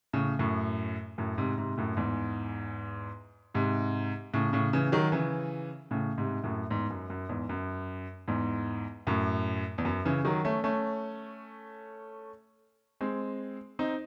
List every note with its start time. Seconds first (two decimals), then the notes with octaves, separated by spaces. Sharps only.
0.13 A2 C#3
0.39 F#2 A2
1.18 F#2 A2
1.38 G#2 C3
1.58 G#2 C3
1.78 F#2 A2
1.97 E2 G#2
3.54 G#2 C3
4.34 A2 C#3
4.53 A2 C#3
4.73 C#3 E3
4.92 D#3 F#3
5.12 C#3 E3
5.91 A2 C#3
6.18 G#2 C3
6.44 F#2 A2
6.70 E2 G#2
6.90 F#2
7.10 F#2
7.29 E2 G#2
7.49 F#2
8.28 E2 G#2
9.07 F#2 A2
9.78 E2
9.85 F#2
10.05 C#3 E3
10.25 D#3 F#3
10.44 A3 C#4
10.64 A3 C#4
13.01 G#3 C4
13.79 C4 D#4